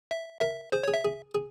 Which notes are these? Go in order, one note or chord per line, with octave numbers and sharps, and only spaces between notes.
E5
A#4 E5
G#4 C5
G#4 C#5
E5
G#4
G#4